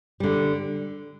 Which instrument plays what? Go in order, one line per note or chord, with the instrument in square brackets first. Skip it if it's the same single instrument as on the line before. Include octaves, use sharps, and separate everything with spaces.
[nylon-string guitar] D3 G3